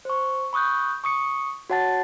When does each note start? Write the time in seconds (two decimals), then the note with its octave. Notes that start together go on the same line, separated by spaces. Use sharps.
0.05 C5 C#6
0.53 B5 C#6 D#6 F#6 G6
1.04 C#6 D#6 C#7
1.70 F#4 C#5 F#5 A5 A6